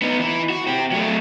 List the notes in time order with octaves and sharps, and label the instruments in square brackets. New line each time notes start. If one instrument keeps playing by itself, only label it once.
[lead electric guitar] B3 D#4
E3
F#4
C4 G4
F#3 A3